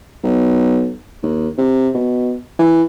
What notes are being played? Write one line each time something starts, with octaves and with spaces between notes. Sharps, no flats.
B1
D#2
C3
B2
E3